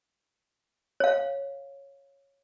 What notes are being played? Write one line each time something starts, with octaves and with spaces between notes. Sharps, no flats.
C#5 F5